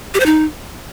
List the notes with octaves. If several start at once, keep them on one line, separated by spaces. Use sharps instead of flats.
G4
C5
D#4